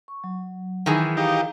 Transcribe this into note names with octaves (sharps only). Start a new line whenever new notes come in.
C#6
F#3
D#3 E3 G#4
D#4 G4 D#5 F5 A#5